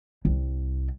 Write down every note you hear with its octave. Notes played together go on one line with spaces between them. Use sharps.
C2